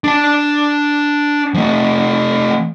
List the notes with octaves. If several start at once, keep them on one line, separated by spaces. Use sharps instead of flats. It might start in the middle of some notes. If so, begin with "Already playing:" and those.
D4 A5
F3 A3